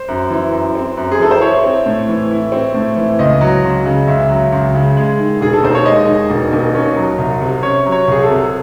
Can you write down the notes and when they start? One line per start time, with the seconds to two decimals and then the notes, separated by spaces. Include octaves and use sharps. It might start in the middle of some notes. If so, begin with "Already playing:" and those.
Already playing: C5
0.08 F#2
0.30 E3
0.52 F#2
0.75 C4
0.97 F#2
1.12 G#4
1.20 E3 A4
1.31 C5
1.41 E4 C#5
1.64 C4
1.86 A2
2.09 E3
2.31 E4
2.52 C4
2.74 A2
2.96 E3
3.19 C#2 D#5
3.41 F#3
3.64 C#2
3.85 C#3
4.07 C#2 E5
4.29 F#3
4.52 C#2
4.74 C#3
4.97 G#3
5.19 D#3
5.41 E1 G#4
5.53 A4
5.63 D#2 C5
5.75 C#5
5.86 G#3 D#5
6.08 D#3
6.30 E1
6.52 D#2
6.75 C#4
6.96 F#3
7.18 C2
7.41 C3
7.63 C#4 C#5
7.86 F#3
7.92 C#5
8.08 C2 G#4
8.22 A4
8.30 C3